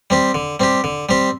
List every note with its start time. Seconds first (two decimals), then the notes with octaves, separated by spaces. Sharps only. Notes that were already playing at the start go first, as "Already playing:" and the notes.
0.10 G3 C4 G4
0.34 D3
0.60 G3 C4 G4
0.84 D3
1.09 G3 C4 G4